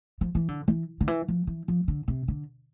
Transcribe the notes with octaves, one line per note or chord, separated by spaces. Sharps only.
F3
E3
D3
E3
D3
E3
F3
E3
F3
D3
C3
D3